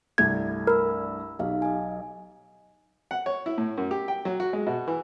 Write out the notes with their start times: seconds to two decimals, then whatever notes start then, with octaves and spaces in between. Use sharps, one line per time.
0.18 C2 G2 A3 G#6
0.67 A#4 B5 E6
1.39 B1 D#4 G4 F5
1.62 D#5 G#5
3.11 F#5
3.26 C#5
3.46 E4
3.58 A2
3.77 F#2
3.91 G4
4.08 G5
4.25 F#3
4.40 F#4
4.53 G#3
4.67 B2
4.88 E3